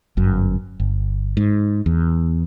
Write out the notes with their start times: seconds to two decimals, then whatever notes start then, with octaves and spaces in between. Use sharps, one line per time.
0.17 G1 F#2
0.80 G1
1.37 G#2
1.86 E2